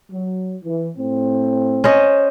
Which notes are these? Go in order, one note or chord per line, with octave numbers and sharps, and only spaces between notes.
F#3
E3
A2 C4
C#4 C5 D#5